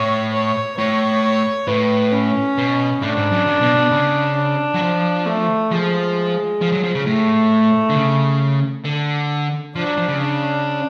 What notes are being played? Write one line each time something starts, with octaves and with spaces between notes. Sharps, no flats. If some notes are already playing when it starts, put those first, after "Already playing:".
Already playing: A2 C#5
C#5
A2 C#5
A2 B4
C#4
B2
A2 D4
G#2
F#2
F#2
B2
B2
C#3
D4
F#3
F3
A3
F3 G#3
F3
F#3
F3
C#3
A2 A3
D3
C#3
D3
F3 D4
F#3
F3
C#3
D4